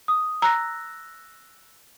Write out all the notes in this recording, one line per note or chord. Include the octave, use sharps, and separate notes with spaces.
D#6
A#5 E6 F#6 A#6